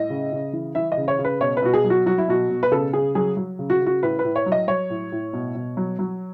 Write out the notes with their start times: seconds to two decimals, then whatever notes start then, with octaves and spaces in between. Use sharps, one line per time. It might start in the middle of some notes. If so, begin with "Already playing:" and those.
Already playing: A2 D#5
0.10 C#3
0.32 C#3
0.53 E3
0.75 E3 E5
0.92 D#5
0.97 C#3
1.08 C#5
1.19 C#3
1.25 B4
1.41 B2 C#5
1.57 B4
1.62 B2 F#4
1.74 G#4
1.84 F#3
1.90 F#4
2.06 F#3 F#4
2.18 E4
2.28 B2 F#4
2.50 B2
2.63 B4
2.72 C#3 A4
2.93 C#3 G#4
3.15 F#3 G#4
3.37 F#3
3.59 C#3
3.70 F#4
3.81 C#3
3.86 F#4
4.03 A2 B4
4.19 B4
4.25 A2
4.36 C#5
4.46 F#3
4.52 D#5
4.68 F#3 C#5
4.90 A2
5.12 A2
5.33 B2
5.55 B2
5.77 F#3
5.99 F#3